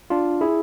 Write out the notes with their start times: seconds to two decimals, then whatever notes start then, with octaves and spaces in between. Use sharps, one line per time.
0.10 D4 F4
0.41 E4 G#4